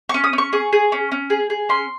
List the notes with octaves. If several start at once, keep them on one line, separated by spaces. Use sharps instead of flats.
C#4 C#6
D#6
C#4
C#6
G#4 C#6
G#4
C#4
C#4
G#4
G#4
C#4 C6